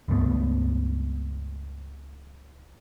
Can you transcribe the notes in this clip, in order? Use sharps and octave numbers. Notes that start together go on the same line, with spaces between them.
C#2 G2 A3 B3